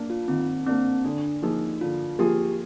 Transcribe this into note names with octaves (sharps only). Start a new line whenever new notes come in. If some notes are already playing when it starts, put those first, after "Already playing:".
Already playing: A#3 D4
F4
D#3 C4
A#3 C4 D4
D3 D4
F3 A#3 D#4 F4 G#4
D3 F4
F3 A#3 F4 G4 G#4